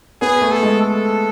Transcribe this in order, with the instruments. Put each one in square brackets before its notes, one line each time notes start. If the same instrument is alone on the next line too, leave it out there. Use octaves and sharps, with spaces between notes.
[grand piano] B3 [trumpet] G#4
[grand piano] A3
[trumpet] A4
[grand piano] G#3
[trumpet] A4